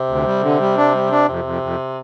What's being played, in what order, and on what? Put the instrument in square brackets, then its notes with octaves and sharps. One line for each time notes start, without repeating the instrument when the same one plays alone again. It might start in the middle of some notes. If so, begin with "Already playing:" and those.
Already playing: [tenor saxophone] C3
[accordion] D2
G3
D3
G3
D4
G3
D4
[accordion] F2 [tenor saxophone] C3
[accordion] F2
F2